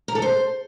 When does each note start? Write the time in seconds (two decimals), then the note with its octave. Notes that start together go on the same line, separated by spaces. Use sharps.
0.08 A#4
0.15 A4
0.22 C5